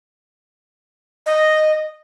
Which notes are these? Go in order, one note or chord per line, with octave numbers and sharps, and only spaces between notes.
D#5